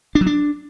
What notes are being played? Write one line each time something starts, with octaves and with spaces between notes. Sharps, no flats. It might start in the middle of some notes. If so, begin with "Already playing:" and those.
D4
F#3
D4